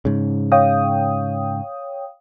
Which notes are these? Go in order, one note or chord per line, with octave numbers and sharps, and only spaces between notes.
G#2 C#3
C#5 F5 G5 D#6